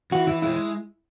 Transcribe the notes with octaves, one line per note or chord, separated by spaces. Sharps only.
E3 F#4
E3 E4
G#3 E4